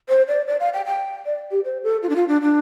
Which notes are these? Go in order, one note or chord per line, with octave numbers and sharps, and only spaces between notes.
C5
D5
D5
F5
G5
G5
D5
G4
C5
A4
F4
D4
F4
D4
D4